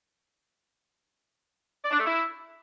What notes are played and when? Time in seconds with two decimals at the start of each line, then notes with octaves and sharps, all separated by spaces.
1.83 D5
1.91 D4
1.98 A3
2.06 E4